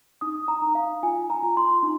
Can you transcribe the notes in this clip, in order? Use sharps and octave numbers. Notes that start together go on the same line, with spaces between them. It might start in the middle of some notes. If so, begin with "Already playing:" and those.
D#4 D#6
A#5
D#4
F5
F4 G#5
A#5
F4
C6
D#4